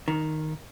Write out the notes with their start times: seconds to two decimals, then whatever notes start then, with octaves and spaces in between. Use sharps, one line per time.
0.08 D#3